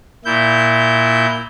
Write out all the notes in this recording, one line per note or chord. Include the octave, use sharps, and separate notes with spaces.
A#2 E4 G6